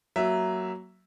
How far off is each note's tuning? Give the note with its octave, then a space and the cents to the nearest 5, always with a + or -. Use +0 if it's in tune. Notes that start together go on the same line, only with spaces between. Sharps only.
F#3 +10 A#3 +0 E5 +0